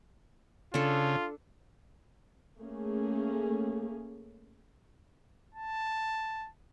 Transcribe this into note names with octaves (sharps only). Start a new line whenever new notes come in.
C#3 D4 F4 A4
A3 A#3 C#4 G#4
A5